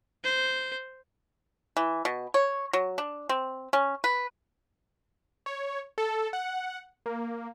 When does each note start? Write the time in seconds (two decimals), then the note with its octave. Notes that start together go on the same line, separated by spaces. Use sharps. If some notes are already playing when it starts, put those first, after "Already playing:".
0.24 C5
1.77 E3
2.05 B2
2.34 C#5
2.73 F#3
2.98 D4
3.29 C4
3.73 C#4
4.04 B4
5.46 C#5
5.98 A4
6.33 F#5
7.06 A#3